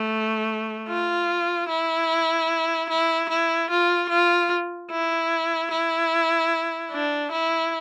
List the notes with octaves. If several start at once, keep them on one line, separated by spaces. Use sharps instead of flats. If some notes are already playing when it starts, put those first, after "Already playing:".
Already playing: A3
F4
E4
E4
E4
F4
F4
E4
E4
D4
E4